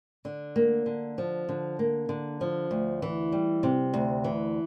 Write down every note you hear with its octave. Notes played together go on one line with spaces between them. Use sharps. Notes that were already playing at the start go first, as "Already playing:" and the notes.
D3
A#3
D3
F3
D3
A#3
D3
F3
D2
E3
G3
C3
D2
E3